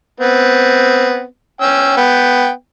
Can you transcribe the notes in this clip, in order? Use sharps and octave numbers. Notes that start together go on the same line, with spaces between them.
B3 C4
C#4 G5 E6
B3 G5